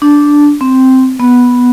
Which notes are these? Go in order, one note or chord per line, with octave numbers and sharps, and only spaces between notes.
D4
C4
B3